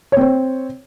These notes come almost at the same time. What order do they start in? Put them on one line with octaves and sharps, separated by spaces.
C#5 C4 C5